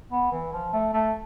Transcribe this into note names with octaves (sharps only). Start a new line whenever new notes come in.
B3
E3
F3
A3
A3